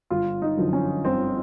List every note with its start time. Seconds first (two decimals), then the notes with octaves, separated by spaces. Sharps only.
0.10 G1 F4
0.42 D#4
0.58 F#2 D3 F3
0.73 C#4
1.04 G1 C4